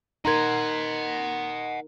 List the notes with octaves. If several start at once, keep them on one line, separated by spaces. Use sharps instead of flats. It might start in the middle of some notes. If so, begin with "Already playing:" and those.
D#4 A#4 D#5 F#5 A#5 C6 G#6